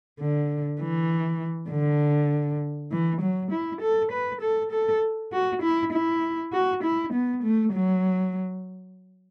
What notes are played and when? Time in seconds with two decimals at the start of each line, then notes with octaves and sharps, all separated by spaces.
0.20 D3
0.80 E3
1.70 D3
2.92 E3
3.21 F#3
3.51 E4
3.81 A4
4.12 B4
4.42 A4
4.72 A4
5.32 F#4
5.62 E4
5.92 E4
6.52 F#4
6.83 E4
7.13 B3
7.43 A3
7.73 F#3